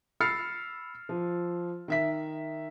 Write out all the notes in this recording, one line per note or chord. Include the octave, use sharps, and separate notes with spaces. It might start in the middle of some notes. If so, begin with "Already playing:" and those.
B5 E6 F6 A6 C7 C#7
F3
D#3 E5 B6